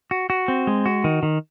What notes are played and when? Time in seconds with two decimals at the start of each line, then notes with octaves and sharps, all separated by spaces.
0.11 F#4
0.30 F#4
0.48 C4
0.67 G#3
0.86 F#4
1.04 D#3
1.23 D#3